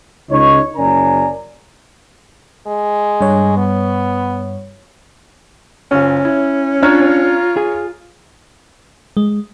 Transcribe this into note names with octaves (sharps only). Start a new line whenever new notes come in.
C#2 D#4 C#5
F#1 C#4 A#4 D5 G#5 A#5
G#3
G2 C#5
B3
F#1 C#4 F4
E4
D4 F4 C#5 A#5 F6
G#4
G#3